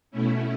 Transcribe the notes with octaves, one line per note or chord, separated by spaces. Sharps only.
B2 A3 C#4 E4